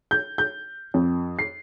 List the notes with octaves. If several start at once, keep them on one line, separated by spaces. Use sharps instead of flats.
G6
G6
F2
C7